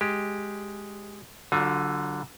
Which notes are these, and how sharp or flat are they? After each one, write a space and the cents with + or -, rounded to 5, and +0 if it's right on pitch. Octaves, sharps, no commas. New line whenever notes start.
G#3 +0 G4 +0
D3 +0 F#3 +35 F4 +35